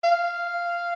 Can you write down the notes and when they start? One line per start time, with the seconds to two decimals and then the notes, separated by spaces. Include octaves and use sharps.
0.03 F5